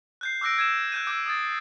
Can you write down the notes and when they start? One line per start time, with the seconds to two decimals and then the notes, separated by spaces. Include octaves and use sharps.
0.21 F#6 G6 C7
0.41 D6 E6 F#6 A#6 D7
0.57 E6 G#6 D#7 E7
0.92 F#6 G6 D#7
1.07 D6 E6 G6 G#6
1.26 D#6 A6